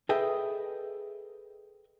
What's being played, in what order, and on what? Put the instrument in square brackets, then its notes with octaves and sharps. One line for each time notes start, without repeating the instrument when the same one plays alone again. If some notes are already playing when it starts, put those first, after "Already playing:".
[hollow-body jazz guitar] G#4 A4 B4 D#5 E5 G5